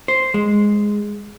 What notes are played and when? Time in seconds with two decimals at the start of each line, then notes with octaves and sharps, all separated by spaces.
0.08 C5
0.34 G#3